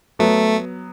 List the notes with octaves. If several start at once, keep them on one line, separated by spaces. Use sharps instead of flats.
F#3 A3 B3